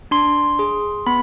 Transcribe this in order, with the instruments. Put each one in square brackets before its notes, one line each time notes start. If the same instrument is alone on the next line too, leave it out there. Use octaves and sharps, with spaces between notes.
[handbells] D4 C6
G#4
B3 B5